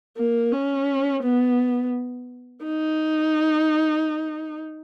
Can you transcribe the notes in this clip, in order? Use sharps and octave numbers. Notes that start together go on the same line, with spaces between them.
A#3
C#4
B3
D#4